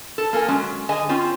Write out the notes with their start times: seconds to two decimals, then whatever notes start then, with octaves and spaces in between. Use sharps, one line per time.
0.18 A4
0.33 A#3 A4 A#4 G#5
0.48 F#3 G#3 C#4
0.89 D3 G#4 D#5 G#5
1.09 C4 C#4 F4